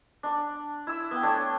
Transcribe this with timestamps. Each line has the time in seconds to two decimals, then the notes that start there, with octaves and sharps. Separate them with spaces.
0.23 D4 D6
0.87 E4 E6
1.11 B3 G5
1.23 A3 D4 C#5 G5